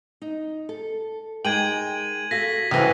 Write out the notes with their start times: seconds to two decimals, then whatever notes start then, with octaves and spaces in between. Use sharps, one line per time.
0.22 D#4
0.69 A4
1.45 G#3 D#4 A#4 G5 G#6 D#7 F#7
2.31 F#4 A4 F5 A#6 B6
2.71 C#2 G2 E3 C5 G5